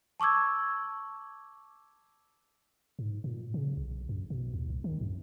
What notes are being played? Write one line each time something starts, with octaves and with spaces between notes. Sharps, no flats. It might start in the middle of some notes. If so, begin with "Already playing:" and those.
A5 C#6 D6 E6 G#6
G#2
A#2
C#3
B1
F#2
B2
D#2
C2
D#3
F#2